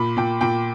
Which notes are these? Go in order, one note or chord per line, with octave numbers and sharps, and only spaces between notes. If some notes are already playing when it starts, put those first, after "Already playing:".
Already playing: A#2 B5
A#2 G5
A#2 G5